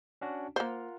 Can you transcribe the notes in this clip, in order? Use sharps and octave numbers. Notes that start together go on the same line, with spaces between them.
C#4 D4 F#4
A#3 F4 A#4 C5 F#5